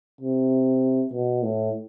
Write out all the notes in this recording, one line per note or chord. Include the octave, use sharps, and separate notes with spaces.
C3
B2
A2